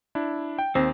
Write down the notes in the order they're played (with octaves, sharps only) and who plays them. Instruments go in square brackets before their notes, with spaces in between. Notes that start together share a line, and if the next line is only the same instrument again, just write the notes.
[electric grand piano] D4 E4
G5
[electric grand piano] D#2 A#6 [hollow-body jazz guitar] C4